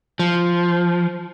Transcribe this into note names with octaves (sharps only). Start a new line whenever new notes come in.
F3